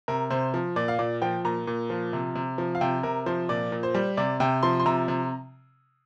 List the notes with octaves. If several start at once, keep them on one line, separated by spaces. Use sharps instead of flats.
C3 A#4
C3 C5
F3
A#2 D5
F5
A#2 D5
F3 G5
A#2 A#5
A#2
F3
C3
C3
F3
F5
C3 G5
C3 A#4
F3 C5
A#2 D5
A#2
C5
G3
C3 D5
C3 G5
F3 C6
C6
C3 A#5
C3